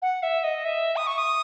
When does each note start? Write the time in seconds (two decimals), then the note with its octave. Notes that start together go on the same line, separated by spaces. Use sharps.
0.02 F#5
0.23 E5
0.44 D#5
0.65 E5
0.96 D#6
1.07 C#6
1.18 D#6